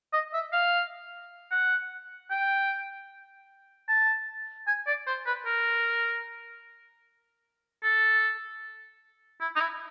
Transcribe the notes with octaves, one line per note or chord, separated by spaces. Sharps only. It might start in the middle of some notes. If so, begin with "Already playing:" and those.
D#5
E5
F5
F#5
G5
A5
G#5
D5
C5
B4
A#4
A4
E4
D#4
E4